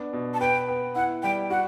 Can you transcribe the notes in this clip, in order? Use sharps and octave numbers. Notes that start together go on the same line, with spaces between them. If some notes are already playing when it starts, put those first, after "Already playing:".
Already playing: B3 D4
B2
A5
B4 G5
B3
E4 F#5
G3 G5
F#4 F#5